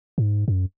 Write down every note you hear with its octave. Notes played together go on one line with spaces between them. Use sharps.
G#2
F#2